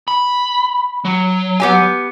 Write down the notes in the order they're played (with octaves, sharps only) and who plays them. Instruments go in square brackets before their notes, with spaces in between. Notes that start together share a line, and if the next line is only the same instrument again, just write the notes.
[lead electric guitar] B5
F#3
[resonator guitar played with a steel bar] B3 G4 G#5